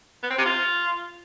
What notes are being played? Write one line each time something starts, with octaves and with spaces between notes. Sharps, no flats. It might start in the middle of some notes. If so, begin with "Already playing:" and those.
B3
C4
C3
F4